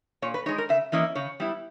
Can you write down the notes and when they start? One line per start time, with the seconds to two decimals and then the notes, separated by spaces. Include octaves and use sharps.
0.22 A#2 C#5
0.34 B4
0.46 D#4 C#5
0.48 G#3
0.58 A#4
0.69 C#3 E5
0.92 E3 A#3 C#4 E4 D#5
1.15 C#3 C#5
1.40 G3 B3 E4